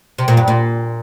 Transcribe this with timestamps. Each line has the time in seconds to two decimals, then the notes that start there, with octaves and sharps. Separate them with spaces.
0.18 C3
0.28 A#2
0.37 G2
0.48 A#2